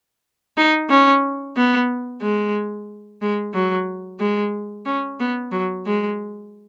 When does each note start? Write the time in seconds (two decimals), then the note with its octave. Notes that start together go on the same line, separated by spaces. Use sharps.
0.57 D#4
0.90 C#4
1.56 B3
2.22 G#3
3.22 G#3
3.54 F#3
4.20 G#3
4.86 C#4
5.20 B3
5.52 F#3
5.86 G#3